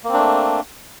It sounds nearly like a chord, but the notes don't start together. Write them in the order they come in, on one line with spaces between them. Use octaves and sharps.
A#3 C4 D4 A3